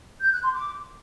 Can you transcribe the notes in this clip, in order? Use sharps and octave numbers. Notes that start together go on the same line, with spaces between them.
G6
F#6
C6
D6